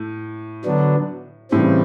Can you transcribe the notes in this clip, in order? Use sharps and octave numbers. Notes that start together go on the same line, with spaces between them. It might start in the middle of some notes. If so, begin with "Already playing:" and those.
Already playing: A2
D3 F#3 B3 D4
A2 C#3 E3 G3 C4